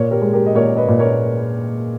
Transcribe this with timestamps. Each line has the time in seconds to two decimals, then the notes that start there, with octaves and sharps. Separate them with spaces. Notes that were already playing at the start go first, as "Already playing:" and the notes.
Already playing: A#2 A#4 C#5
0.11 G4 A#4
0.22 G#3
0.33 G4 A#4
0.46 D#5
0.55 A#2 A#4 C#5
0.77 B4 D#5
0.88 A#2
0.99 A#4 C#5